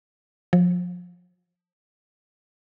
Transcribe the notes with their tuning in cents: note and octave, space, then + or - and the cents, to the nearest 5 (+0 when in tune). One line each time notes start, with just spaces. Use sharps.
F3 +30